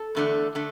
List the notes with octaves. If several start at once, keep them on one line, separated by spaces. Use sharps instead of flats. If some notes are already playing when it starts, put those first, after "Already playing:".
Already playing: A4
E2 D3 A3 D4
D3 A3